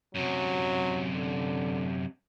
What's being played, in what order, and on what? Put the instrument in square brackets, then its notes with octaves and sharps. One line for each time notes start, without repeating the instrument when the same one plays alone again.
[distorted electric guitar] F#2 C3 [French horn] F#3
[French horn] D3